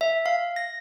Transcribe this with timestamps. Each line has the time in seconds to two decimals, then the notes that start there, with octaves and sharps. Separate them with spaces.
0.01 E5
0.26 F5
0.56 A#6